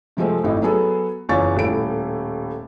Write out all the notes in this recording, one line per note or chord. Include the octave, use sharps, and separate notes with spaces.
C3 F3 G#3 A3 C4
G#1 A2 D#4 E4
F#3 B3 G#4 A4
F#1 E2 F4 C#5 C#6 A6
D#1 A2 E4 D7